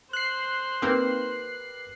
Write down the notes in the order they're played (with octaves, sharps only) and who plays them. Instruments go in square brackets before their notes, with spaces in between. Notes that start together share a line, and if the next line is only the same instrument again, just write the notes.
[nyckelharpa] C5 [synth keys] F#6 C7
[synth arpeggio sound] A#3 C4 D#4 [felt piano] G4 A#4 B4